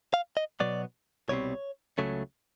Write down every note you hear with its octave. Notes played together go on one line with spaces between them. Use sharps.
F5
D#5
B2 F#3 B3 D5
C2 B2 G3 C4 C#5
C#2 C#3 F#3 A3 C#4